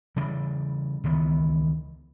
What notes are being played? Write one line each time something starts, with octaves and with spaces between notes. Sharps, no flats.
C#3 E3 G3
C#2 D#3 E3 B3